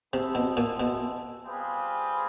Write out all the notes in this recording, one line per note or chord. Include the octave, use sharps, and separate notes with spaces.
C3 G#3 B3 E4 A4
B2
A#2
B2
G3 C4 F4 G#4 B4